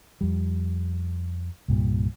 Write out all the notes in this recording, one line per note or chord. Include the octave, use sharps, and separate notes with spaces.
F2 G3
C2 G2 A#2